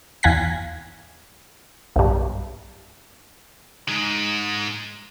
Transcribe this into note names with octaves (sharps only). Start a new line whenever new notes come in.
E2 F5 G#5 F#6 A#6 B6
B1 G2
G#2 G#3